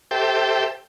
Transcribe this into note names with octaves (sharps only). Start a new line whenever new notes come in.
G4 A4 C5 E5 G5